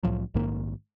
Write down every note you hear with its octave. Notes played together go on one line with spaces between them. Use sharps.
C2 A2 F3 F#3
A#1 G#2 D#3 A#3